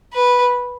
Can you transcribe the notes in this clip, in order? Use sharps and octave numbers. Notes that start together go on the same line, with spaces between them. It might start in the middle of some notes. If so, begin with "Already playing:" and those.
B4